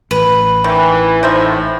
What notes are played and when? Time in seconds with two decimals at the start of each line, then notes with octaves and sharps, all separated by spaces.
0.11 A1 B4
0.64 D#3 E3
1.23 A2 D#4 C5 E5